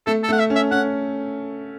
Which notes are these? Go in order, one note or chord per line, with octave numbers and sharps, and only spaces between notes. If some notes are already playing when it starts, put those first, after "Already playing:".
A3 A4
A4
A3
F#5
E5
C#4
E5
C#4 F#5